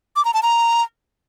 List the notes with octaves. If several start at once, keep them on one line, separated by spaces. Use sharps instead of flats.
D6
A#5
A5
A#5